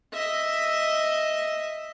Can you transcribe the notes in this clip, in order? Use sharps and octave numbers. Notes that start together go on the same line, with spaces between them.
D#5 E5